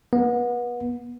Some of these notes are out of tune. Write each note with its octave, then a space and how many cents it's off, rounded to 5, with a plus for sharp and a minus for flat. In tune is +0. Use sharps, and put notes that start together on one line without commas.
B3 -30